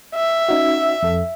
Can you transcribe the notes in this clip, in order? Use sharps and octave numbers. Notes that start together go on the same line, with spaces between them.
E5
C#4 D#4 F#4
F2 A4